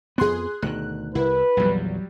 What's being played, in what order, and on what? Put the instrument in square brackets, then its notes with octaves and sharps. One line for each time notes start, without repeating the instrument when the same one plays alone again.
[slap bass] F2 B3 [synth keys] G#4 C6 F#6
[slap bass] D2 B2 D#3 [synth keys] F#6
[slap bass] C2 [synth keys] E4 [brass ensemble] B4
[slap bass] A#1 E2 [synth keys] F#3 G3